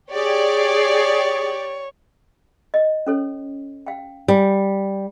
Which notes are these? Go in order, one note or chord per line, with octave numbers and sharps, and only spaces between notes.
G4 G#4 C#5 D5
D#5
C#4 A4 C#5
F5 G5
G3 G#5